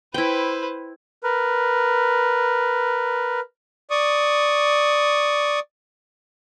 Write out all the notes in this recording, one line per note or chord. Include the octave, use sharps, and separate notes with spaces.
E4 B4 C5 G5
A#4 B4
D5 C#6 D#6